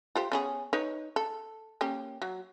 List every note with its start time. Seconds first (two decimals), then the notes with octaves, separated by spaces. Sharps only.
0.15 F4 G4 C5
0.32 B3 C#4 G#4
0.73 D#4 B4 C#5
1.16 A4
1.81 A#3 C#4 G4
2.22 F#3